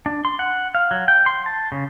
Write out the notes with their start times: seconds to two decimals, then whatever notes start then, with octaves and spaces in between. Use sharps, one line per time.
0.06 D4
0.25 C6
0.39 F#5
0.75 F5
0.91 F#3
1.08 G5
1.26 C6
1.46 A5
1.72 C#3